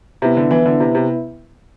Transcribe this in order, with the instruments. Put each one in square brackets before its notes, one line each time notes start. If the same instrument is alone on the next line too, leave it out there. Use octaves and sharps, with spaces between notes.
[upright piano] C3 [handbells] B3 E4 B4 E5
[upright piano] D3
[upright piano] E3 [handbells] B3 E4 B4 E5
[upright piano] D3
[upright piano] C3 [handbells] B3 E4 B4 E5
[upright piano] C3